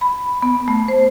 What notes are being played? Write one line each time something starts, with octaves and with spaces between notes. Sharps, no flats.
B5
B3
A3
C5